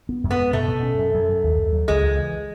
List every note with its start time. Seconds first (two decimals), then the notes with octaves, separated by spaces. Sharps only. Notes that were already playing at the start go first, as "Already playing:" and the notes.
0.09 B3
0.24 F#2
0.31 B3
0.39 G#3
0.53 B2 A3
0.68 B2
0.83 C#4
0.98 F#2
1.14 F#2
1.29 F#3
1.44 D#2
1.58 D#2
1.73 F#3
1.88 C#2 G#3
2.03 C#2
2.19 E3